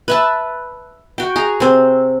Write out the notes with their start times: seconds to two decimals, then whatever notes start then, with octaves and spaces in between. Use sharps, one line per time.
0.08 B4 E5 A5
1.18 F#4 G5
1.36 G#4 A#5
1.60 C3 C4